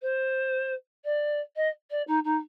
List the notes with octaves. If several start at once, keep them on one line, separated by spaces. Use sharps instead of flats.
C5
D5
D#5
D5
D#4
D#4